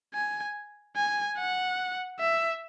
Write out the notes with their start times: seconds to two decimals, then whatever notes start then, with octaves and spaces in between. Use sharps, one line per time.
0.14 G#5
0.96 G#5
1.38 F#5
2.19 E5